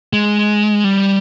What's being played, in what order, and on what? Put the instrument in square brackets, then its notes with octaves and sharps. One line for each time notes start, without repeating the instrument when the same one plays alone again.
[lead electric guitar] G#3
G3